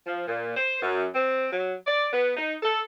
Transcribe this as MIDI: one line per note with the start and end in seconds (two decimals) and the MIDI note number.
0.07 0.25 53
0.27 0.52 46
0.56 0.79 72
0.82 1.06 42
1.14 1.48 60
1.51 1.74 54
1.86 2.06 74
2.13 2.34 59
2.35 2.54 63
2.62 2.80 69